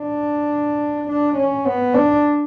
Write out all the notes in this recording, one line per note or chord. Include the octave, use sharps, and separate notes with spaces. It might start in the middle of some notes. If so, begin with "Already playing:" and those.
Already playing: D4
D4
C#4
B3
D4